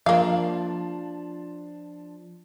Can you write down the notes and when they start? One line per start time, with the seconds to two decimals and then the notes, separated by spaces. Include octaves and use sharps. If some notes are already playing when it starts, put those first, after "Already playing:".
0.06 F3 A#3 D4 F5